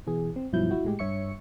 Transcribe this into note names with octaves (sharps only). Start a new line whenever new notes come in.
B2 E3 G#4
C4
G2 B2 F3 F#3 E4 G6
E4 F#4
A2 G#3 G4
G2 C#5 E5 C#6 C#7